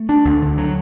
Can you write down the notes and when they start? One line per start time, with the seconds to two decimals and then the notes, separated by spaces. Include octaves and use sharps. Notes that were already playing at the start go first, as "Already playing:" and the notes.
Already playing: A3
0.09 D4
0.25 D2
0.42 D3
0.58 F#3